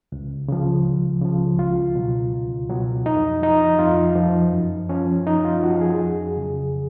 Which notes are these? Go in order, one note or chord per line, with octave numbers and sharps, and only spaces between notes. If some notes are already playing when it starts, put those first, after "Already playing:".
C#2
C#3 F3
C#2
C#3 F3
C#2 F4
B2 F#3
C#2
B2 F#3
F2 D#4
F3 D#4
F2 F4
F3
F#2
F3 C#4
F#2 D#4
F4
F3 F#4
G#4
F2
C#3 F#3